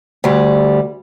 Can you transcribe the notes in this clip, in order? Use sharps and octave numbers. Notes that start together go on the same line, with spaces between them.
D2 G3